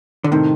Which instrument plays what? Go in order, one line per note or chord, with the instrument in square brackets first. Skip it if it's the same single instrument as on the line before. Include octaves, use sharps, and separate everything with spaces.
[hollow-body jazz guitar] D3
[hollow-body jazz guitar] A2 C3 [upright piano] D#3